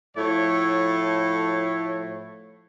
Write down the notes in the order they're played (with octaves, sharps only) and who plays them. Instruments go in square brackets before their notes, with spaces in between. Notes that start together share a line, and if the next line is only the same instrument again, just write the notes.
[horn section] A2 F3 A3 E4 C#5